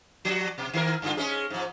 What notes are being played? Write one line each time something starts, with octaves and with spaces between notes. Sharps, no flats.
F3 F#4
B2
D#3 A#4
G2 D3 F4
G#3 C#4 G#4
G#2 F3